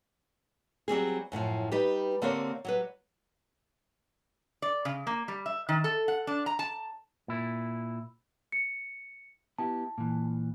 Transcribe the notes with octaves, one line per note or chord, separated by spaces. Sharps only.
F#3 G3 C4 G#4
F#2 A2 E3 F3
G3 D#4 G4 B4
D3 A#3 C4 G4 A#4 C#5
F#3 G3 B4
D5
C#3
A#3
G3
E5
D#3
A4
F#5
D4
A#5
A5
A#2 E4
C#7
B3 E4 G4 A5
A#2 E3